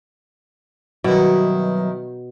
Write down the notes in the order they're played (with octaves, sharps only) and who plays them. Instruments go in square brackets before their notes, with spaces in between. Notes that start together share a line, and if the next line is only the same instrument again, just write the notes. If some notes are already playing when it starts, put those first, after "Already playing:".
[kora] B2 [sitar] D#3 E4 [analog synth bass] F#3 [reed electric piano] G3 F#4 B4